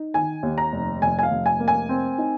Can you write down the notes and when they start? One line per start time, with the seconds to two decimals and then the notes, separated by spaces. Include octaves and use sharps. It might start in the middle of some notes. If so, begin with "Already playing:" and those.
Already playing: D#4
0.14 D#3 G#5
0.43 D#2
0.58 A#5
0.72 F1
1.02 F1 G#5
1.19 G#5
1.23 F5
1.31 F1
1.46 G#5
1.60 A#3
1.68 G#5
1.89 C4
2.18 D#4